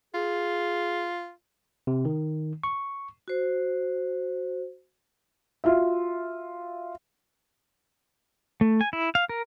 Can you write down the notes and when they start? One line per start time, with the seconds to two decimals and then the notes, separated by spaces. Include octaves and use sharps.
0.14 F4 G#4
1.87 C3
2.05 D#3
2.64 C#6
3.28 F#4 C5
5.64 F4 F#4 E5
8.61 A3
8.81 G#5
8.93 E4
9.15 F5
9.29 A#4